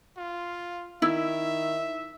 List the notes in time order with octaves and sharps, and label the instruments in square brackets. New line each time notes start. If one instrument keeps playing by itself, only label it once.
[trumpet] F4
[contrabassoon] D#3 [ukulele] E4 [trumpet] E5